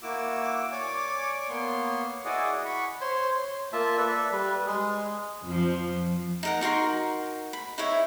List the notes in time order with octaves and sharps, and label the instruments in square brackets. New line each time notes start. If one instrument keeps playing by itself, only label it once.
[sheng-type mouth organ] A#3 E4 F#4 D6 E6
C#5 D5 G#5 D6
A#3 B3 C#5 C6
E4 F#4 G#4 D5 D#5 F#5
F#5 B5 C#6
[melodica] C5 C#5 C6
C6
A#3 F4 E5 A5
A4 B4 D5 E5
G3 B4
G#3 G#4
[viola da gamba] F2 F3
[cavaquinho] D#4 A#4 F#5
D#4 F#4 A#4 C6
B5
D#4 E4 C#5 E5